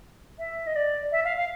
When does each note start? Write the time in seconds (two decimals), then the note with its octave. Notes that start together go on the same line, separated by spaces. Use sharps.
0.39 E5
0.67 D#5
0.75 D5
1.12 E5
1.24 F5
1.37 F5